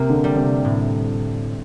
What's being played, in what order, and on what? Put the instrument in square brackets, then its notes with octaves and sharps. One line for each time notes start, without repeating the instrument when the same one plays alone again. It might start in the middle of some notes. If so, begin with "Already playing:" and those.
Already playing: [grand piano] C3 [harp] A#3
[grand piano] D3
[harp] G3
[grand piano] C3
[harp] A2